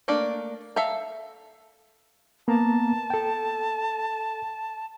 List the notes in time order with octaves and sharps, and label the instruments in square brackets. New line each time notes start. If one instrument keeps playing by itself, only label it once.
[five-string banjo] A3 A#3 D4
A4 E5 F5 A#5
[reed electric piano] A#3 B3 A#5 [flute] A5
[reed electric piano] A4 G5